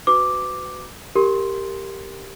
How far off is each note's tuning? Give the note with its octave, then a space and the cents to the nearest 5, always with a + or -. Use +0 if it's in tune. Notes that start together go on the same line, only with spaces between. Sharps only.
F#4 +0 B4 +30 D6 +0
G4 +0 A#4 -15 C6 +0